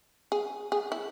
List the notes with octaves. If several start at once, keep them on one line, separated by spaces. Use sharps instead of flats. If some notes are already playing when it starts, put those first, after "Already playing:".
G#4
G#4
E4